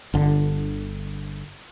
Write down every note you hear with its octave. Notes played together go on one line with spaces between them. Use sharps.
G1 D3